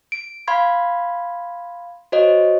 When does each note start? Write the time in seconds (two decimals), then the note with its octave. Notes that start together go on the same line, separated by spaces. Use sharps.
0.12 D7
0.48 F5 B5 C6 G#6
2.12 F#4 C5 C#5 D#5